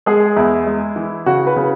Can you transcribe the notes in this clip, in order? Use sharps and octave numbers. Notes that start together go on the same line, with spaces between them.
G#3 G#4
E2 E4
G#3
E3
C#3 F#4
B4
C#3